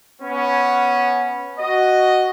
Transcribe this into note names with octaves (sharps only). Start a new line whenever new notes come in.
B3 C#4
F#4 D#5